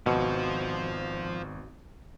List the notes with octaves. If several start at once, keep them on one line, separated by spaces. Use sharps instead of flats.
G#1 B2 F4 F#4 C5 C#7